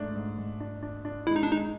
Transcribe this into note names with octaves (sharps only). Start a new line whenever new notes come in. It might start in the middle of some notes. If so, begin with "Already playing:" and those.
Already playing: G#2 A3 D4
G#2
G#2
D4
D4
D4
G#3 E4
D#4
D4
G#3 D#4